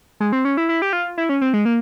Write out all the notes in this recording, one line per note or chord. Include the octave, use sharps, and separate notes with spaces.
G#3
C4
C#4
E4
E4
G4
F4
E4
C#4
C4
G#3
A#3